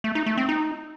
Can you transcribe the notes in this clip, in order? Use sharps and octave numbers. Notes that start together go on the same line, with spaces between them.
A3
D#4
A3
C4
D#4